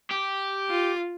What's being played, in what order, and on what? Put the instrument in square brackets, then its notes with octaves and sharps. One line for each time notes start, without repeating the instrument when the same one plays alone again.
[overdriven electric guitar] G4
[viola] F4